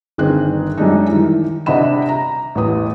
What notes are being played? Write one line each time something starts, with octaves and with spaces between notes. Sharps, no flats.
G1 D#3 C4 G#4 F#6
F#2 G3 G#3 D4 D#4
D#3 E3
C3 D4 D#5 F#5 B5 E7
A#5
A1 E2 B4 D#6